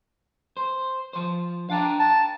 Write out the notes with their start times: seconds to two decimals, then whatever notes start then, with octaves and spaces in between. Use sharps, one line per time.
0.57 C5
1.13 F3 C5
1.70 D4 F5 G5 A#5
1.99 A5